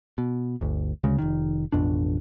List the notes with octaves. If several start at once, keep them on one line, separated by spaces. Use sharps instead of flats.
B2
G1 D2
D2 C#3 G#3
F1 B1 D#3
A1 F2 B2 D4